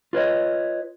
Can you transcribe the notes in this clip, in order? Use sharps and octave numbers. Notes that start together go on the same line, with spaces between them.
F4 B4 C#5 D#5